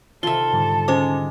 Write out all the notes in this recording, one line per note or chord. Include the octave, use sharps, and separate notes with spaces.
C3 D#3 F4 A4 E5 G7
G#2 D3 G3
G#3 C#4 C5 D6